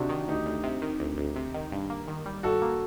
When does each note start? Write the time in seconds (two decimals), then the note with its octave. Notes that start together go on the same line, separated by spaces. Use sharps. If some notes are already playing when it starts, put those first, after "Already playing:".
Already playing: D2 C3 D4 D#4 F#4 G4
0.09 D#3
0.28 D2 D#4 G4
0.46 D2
0.63 C3
0.82 D#3
1.00 D2
1.18 D2
1.36 C3
1.54 D#3
1.72 G2
1.90 A#3
2.08 D#3
2.26 G3
2.43 G2 F#4 A4
2.62 A#3